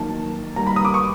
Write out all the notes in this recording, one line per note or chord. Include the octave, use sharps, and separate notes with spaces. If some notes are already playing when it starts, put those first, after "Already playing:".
Already playing: D#3 F#3 A#3 A5
D#3 G3 A#3 A#5
B5
D#6
D6
C#6